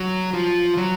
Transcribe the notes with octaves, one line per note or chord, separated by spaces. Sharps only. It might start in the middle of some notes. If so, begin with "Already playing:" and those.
Already playing: F#3
F3
F#3